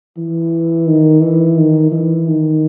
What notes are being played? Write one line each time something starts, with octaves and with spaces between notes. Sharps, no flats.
E3
D#3
E3
D#3
E3
D#3